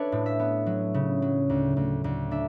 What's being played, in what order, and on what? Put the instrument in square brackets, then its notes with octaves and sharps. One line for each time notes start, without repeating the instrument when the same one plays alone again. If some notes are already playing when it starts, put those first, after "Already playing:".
Already playing: [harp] D4 A4 B4 C#5 E5
A2
E5
B3
F#3
C#3
F#3
D2
D2
D2
D4 E5